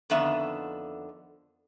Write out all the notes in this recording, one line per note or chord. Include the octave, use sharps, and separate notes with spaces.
F2 D3 D#3 B3 E5